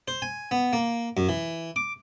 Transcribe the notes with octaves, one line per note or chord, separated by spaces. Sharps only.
C5
G#5
B3
A#3
F#2
E3
D6